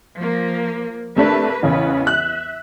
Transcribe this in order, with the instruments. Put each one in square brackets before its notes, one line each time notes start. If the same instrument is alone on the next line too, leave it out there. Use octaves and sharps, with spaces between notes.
[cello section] F3 A#3
[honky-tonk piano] C3 A3 D4 [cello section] A#3 B4
[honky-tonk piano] A1 C#3 [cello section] E2 B3 B4
[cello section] E5 [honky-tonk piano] F#6